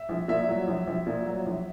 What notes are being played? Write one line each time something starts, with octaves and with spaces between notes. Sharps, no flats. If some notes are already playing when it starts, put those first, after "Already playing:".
Already playing: E5
A#1
A#2 E5
F#3
A#1
A#1
A#2
F#3
A#1